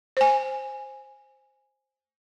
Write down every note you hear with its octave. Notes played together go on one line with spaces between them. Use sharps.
C5 G#5